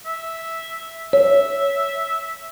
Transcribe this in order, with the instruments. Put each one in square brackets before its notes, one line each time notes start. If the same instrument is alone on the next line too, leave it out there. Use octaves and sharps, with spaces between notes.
[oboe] E5
[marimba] C#5 [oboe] E5